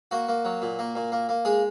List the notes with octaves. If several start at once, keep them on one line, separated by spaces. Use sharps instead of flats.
A#3 F#4
A#3
F#3
A#2
A#3
A#2
A#3
A#3
G#3 G#4